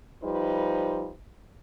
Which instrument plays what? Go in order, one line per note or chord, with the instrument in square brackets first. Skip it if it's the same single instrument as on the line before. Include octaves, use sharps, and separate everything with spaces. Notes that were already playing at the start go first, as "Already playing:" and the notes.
[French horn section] F3 G3 D#4 B4 C5